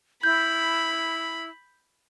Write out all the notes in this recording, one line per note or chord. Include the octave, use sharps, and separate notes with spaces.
E4 B5 G6